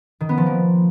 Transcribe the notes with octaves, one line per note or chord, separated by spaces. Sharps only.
D#3
B3
F3
A#3